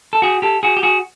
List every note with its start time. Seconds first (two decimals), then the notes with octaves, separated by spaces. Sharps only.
0.13 A4
0.22 F#4 G#4
0.42 G4 A4
0.63 F#4 G#4
0.77 G4
0.83 F#4 G#4